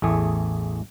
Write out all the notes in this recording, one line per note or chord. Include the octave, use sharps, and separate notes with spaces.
A1 E2 A3 G#4